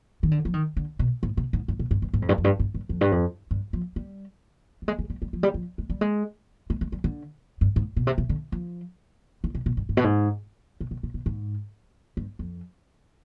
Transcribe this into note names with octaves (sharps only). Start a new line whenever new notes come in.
D#3
D3
F3
D#3
D3
B2
G#2
C3
G#2
G2
B2
G2
G2
G#2
F2
G2
F2
G2
G2
G2
F2
G2
F2
G2
F3
G3
G3
G#3
G#3
G3
G3
F3
G3
F3
G#3
G3
G#3
G#3
G#3
G3
D3
G2
G#2
B2
C3
C3
D3
F3
D#3
C3
B2
G2
G#2
B2
G#2
C3
B2
C3
B2
G#2
G2
F2